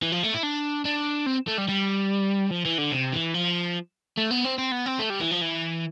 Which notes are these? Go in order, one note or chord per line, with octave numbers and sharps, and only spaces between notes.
E3
F3
A3
E4
D4
D4
C4
A3
G3
G3
F3
E3
D3
C3
E3
F3
A3
B3
C4
C4
B3
C4
A3
G3
E3
F3
E3